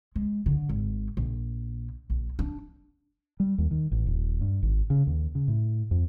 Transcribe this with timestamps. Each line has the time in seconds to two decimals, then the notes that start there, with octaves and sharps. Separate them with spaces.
0.16 G#3
0.46 D3
0.69 G#1
1.17 A#1
2.10 A#1
2.39 D4
3.40 G3
3.58 D#2
3.71 D#3
3.92 A1
4.07 D#1
4.41 G2
4.63 G#1
4.90 C#3
5.07 D#2
5.35 C#3
5.48 A2
5.91 F2